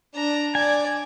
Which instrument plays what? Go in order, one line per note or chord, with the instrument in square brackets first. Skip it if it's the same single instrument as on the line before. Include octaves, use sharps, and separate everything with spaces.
[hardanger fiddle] D4 A#5
[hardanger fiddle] D5 [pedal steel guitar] G#5